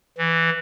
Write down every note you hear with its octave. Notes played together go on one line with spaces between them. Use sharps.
E3